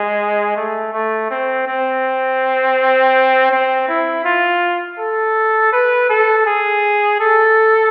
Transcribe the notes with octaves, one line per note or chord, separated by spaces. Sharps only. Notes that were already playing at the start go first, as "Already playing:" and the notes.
Already playing: G#3
A3
A3
C4
C4
C4
E4
F4
A4
B4
A4
G#4
A4